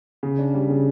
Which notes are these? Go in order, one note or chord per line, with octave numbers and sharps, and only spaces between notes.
C#3
D4
G3
C#3